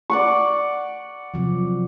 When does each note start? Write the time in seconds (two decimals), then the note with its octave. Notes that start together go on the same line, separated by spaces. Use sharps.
0.10 D5 F#5 C#6
1.34 C3 F3 F#3